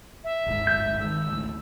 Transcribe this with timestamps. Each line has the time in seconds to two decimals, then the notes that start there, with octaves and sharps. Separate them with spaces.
0.24 E5
0.46 D1 G1 G#2
0.67 G6
1.00 D#3 G#3 E6
1.30 A1 D2